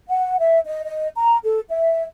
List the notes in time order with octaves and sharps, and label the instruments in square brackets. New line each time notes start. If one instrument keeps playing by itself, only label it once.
[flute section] F#5
E5
D#5
D#5
A#5
A4
E5